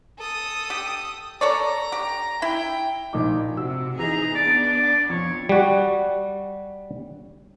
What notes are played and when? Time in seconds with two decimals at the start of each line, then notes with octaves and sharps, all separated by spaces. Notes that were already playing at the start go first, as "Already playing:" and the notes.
0.19 A4 D#6
0.70 G4
1.41 A4 C#5 D5 A#5
1.92 G4
2.42 E4 G5
3.13 A#1 D#4 D6
3.57 C3 F#4 E6
3.99 E3 D#4 G#4 A#5
4.35 B3 D4 D5
4.65 D5
5.10 F2 C#5
5.49 G3 F#4